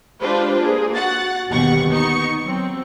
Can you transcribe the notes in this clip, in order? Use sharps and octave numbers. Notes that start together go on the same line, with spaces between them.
G#3 D4 F4 G4 B4 C5
A#3 G#4
F#4 F#5 A6
G1 D#2 B2 G4 F#5 C#6
B3 D#4 C#6 C#7
F#3 C4